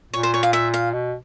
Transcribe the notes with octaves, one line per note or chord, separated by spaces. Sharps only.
A#2 C#5
C5
C#5
F5
E5
F5
B2